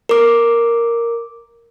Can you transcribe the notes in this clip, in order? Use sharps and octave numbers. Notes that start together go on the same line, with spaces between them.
A#4 D6